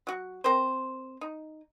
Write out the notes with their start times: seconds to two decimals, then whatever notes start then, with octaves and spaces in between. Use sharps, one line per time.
0.07 F#3 F#4
0.44 C4 A#4 C5
1.21 D#4